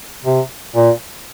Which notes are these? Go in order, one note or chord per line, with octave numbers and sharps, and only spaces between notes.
C3
A#2